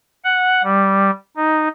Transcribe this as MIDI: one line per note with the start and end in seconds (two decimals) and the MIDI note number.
0.25 0.62 78
0.64 1.11 55
1.36 1.68 63